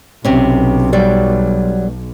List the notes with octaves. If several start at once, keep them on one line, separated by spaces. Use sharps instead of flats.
B1 C3 C#4
F#3 G3 D5